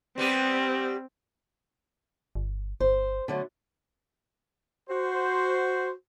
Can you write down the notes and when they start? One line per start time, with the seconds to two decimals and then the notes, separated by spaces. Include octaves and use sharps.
0.18 G3 B3 C4 G4
2.35 G1
2.80 G1 C5
3.28 D3 F#3 A3
4.90 F#4 C5